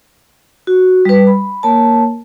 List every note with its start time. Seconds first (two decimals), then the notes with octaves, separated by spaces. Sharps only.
0.67 F#4
1.05 G3 B4
1.27 B5
1.63 A#3 A#4 C#5 A5